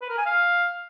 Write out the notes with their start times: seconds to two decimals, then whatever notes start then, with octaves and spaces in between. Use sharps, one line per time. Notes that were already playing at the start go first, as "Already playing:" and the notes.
0.02 B4
0.10 A#4
0.18 G#5
0.26 F5